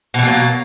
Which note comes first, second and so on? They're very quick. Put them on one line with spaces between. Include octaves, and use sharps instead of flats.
B2 E3 A#3 F#3